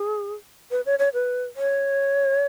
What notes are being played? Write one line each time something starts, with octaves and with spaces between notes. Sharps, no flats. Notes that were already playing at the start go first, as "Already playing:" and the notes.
Already playing: G#4
B4
C#5
C#5
B4
C#5